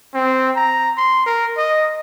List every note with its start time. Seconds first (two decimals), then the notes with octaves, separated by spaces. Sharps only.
0.14 C4
0.56 A#5
0.97 C6
1.26 A#4
1.57 D#5